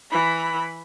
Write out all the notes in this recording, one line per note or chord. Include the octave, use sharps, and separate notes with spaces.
E3 B5